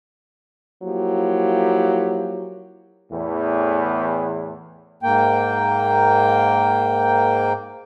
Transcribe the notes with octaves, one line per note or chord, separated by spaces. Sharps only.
F3 F#3 A#3 E4 G4
E2 A2
G#2 A#3 G5